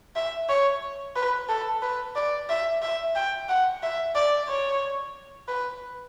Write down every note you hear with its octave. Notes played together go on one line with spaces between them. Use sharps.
E5
C#5
B4
A4
B4
D5
E5
E5
G5
F#5
E5
D5
C#5
B4